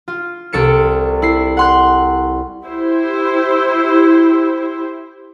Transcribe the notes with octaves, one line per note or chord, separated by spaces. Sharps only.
F4
C2 A4 C#7 D7
E4 C7
F#5 C6 F#6
E4 G4 C5